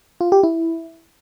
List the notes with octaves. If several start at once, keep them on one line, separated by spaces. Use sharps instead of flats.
F4
G4
E4